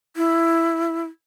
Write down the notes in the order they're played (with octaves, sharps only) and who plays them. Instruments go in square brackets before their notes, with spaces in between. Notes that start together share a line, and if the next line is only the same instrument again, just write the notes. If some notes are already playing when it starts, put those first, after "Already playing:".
[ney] E4